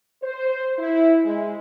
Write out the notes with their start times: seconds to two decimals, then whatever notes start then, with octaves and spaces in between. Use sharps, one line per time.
0.22 C5
0.79 E4
1.24 G#3